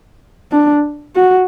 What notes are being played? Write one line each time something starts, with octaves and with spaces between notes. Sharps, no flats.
D4
F#4